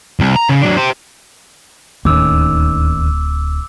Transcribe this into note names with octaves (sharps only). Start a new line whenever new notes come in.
C2
A#5
C#3
F#3 D4
G4 C5
D1 D#2 D#3 C#4 D6 E6